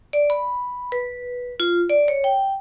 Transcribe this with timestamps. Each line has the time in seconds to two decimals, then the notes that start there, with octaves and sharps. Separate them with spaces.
0.13 D5
0.30 B5
0.92 B4
1.60 F4
1.90 D5
2.08 C#5
2.24 G5